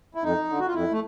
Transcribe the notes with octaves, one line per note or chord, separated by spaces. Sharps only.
E4
F2 D#4
D3
F#4
F4
F2 E4
A3